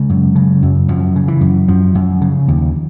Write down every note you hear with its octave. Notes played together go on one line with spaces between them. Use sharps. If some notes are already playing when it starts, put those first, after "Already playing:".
Already playing: C#3 G#3
F#2
C#3
F#2
F#2 F3
C#3
E3
F#2
F#2 F3
F#2
C#3
D#2